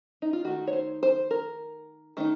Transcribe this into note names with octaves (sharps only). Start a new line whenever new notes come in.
D#4
F4
D#3 A3 D#4 F#4
C#5
C5
C5
A#4
D#3 A3 C4 D#4